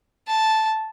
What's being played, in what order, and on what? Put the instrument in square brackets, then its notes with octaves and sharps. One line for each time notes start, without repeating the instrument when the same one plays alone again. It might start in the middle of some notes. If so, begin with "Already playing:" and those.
[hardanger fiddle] A5